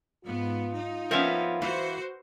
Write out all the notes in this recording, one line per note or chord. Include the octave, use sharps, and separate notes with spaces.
G#2 B3 F4
D#4
F3 B3 C#4 A#4 E5 F5
E3 F#4 C5